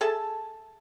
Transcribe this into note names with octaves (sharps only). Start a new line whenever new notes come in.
G#4 A4 E5 A5